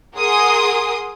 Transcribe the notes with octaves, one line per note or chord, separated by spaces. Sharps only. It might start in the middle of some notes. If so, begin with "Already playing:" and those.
G#4 A#4 F#5 C6 D#6